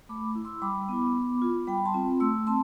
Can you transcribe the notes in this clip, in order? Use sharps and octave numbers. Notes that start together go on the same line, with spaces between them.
A3 B5 D6
E4
C6 E6
G3 B5 D6
B3 E4
B3
F4
G3 G5 B5
A5 C6
C4 F4
A3 C6 E6
C4 A5 C6